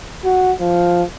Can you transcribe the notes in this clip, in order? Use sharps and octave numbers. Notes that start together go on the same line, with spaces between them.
F#4
F3